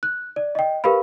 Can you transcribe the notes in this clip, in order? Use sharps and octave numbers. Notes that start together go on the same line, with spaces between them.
F#6
D5
D#5 G5
G4 A#4 B4 F5 B5